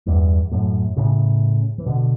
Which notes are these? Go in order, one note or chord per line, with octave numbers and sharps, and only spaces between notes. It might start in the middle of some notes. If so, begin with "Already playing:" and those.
E2 G2
F#2 A2
A2 C#3
E3
B2 D3